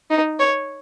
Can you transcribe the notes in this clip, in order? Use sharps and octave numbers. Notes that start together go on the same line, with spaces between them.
D#4
C#5